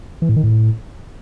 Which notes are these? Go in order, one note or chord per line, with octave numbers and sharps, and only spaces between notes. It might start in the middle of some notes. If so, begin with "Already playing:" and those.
E3
A2
D#3
A2